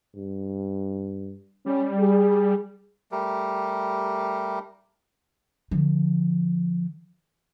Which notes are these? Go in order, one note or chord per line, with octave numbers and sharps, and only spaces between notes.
G2
G3 C#4
G#4
G3 A3 G4 A#4
D3 F3